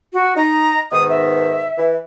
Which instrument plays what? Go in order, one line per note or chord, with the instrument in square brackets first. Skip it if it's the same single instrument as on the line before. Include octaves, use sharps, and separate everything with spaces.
[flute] F#4
[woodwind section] D#4 [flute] A#5
[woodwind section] G#2 B2 D#3 [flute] D#6
[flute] E5
[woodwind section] E3